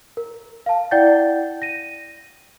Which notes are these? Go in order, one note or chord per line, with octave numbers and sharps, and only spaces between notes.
A#4
F5 A5
E4 D5 F#5 G5 G6 A6
A#6 D#7